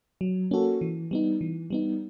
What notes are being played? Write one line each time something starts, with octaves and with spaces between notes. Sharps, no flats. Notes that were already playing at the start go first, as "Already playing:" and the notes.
F#3
A#3 C#4 F#4 A4
E3
G3 B3 D#4
E3
G3 B3 D#4